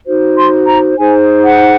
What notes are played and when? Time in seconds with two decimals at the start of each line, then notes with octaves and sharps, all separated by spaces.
0.06 D#4 F#4 C5
0.36 C6
0.67 A#5
0.98 D#4 G#4 C5 G#5
1.44 F#5